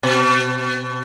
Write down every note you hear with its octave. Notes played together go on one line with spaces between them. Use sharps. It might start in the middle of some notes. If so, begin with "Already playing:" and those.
B2